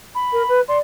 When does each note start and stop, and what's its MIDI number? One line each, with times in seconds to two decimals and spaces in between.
0.15 0.60 83
0.33 0.42 70
0.49 0.61 71
0.68 0.79 74
0.68 0.78 84